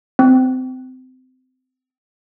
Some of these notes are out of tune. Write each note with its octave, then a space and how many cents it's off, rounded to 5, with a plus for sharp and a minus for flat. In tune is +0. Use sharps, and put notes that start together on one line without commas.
C4 -25